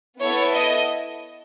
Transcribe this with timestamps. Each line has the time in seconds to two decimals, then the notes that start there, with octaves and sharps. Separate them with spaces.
0.20 B3 E4 A4 C#5
0.54 D#5